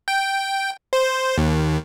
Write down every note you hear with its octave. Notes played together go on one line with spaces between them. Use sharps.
G5
C5
D#2